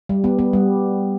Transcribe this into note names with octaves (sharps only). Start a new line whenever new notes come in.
G3
B3
B3
G3